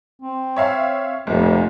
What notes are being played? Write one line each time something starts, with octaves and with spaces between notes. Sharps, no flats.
C4
C#5 E5 F5
F1 B1 A#2